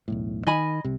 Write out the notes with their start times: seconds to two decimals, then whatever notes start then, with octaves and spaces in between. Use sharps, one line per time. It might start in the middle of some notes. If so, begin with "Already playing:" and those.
0.08 E1 B1 A2
0.47 D#3 D#5 G#5 B5
0.85 C2 C3